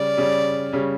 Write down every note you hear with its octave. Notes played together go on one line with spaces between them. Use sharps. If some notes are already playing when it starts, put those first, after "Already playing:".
Already playing: C#3 G3 C#4 D5
C#3 G3 C#4
C#3 G3 C#4